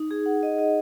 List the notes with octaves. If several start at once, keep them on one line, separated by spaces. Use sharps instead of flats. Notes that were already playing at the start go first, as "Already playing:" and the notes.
Already playing: D#4
G#4
F#5
D#5
D#5